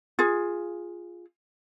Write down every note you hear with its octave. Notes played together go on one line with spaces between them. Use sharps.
F4 G#4